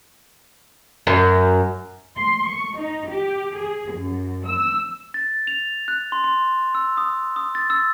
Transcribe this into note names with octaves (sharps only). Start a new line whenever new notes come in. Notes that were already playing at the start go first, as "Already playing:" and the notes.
F#2
C6
C#6
D#4
G4
G#4
F#2
E6
A6
F7
F#6
C6
C6
E6
D#6
D#6
A6
E6